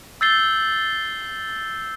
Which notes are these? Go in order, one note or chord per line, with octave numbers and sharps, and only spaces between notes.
E6 G6 A6 C7 G7